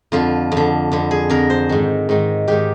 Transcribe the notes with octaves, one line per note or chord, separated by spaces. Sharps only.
F2 D3 F4
F2
D3
F2 D3
G#4
F2 D3 A#4
C5
G#2 D#3
G#2 D#3
G#2 D#3 G4